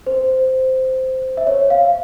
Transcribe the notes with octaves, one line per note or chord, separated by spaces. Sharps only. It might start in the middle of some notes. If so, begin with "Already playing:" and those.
C5
E5
C#5
F5